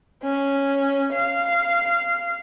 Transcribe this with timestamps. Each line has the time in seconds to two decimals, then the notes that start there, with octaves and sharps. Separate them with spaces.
0.23 C#4
1.13 F5